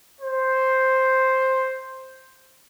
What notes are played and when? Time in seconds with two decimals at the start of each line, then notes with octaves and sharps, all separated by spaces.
0.21 C5